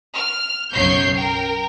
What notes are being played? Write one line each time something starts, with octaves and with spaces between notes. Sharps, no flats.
F6
B1 F#2 C#3 C#5 G6 C7
A#4 G5